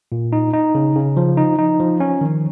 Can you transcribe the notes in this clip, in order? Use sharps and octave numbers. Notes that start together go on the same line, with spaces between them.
A#2
D#4
D#4
C#3
C#3
F3
D#4
D#4
F3
C#4
D#3